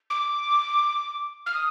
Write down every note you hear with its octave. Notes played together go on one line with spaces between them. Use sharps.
D6
F6
D#6